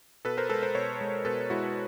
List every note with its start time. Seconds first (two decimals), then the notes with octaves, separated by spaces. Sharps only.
0.25 B2 A4 B4
0.37 A#4 C5
0.49 G#3 A4 B4
0.63 A#4 C5
0.75 B2 B4 C#5
1.01 G#3
1.25 B2 A4 B4
1.50 G#3 E4 F#4